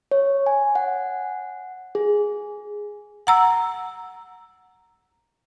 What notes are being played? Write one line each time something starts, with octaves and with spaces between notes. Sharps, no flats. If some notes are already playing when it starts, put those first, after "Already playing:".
C#5
G#5
F#5
G#4
F#5 A#5 E6